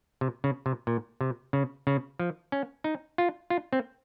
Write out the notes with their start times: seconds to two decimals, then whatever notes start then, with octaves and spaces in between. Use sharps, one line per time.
0.21 C3
0.44 C#3
0.66 C3
0.87 A#2
1.21 C3
1.53 C#3
1.87 C#3
2.19 F3
2.52 C#4
2.84 D#4
3.18 F4
3.50 F4
3.73 C4